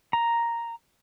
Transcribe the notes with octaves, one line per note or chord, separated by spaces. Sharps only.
A#5